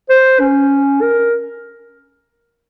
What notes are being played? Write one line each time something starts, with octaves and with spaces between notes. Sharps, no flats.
C5
C#4
A#4